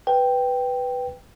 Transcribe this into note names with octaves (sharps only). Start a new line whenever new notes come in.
B4 G5